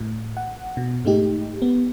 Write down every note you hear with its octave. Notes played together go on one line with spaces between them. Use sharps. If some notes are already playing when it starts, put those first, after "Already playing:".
A2
F#5
B2
G#2 G#3 A3 D#4 G4
B3